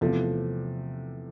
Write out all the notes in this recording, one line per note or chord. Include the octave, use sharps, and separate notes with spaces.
E2 C3 F3 A3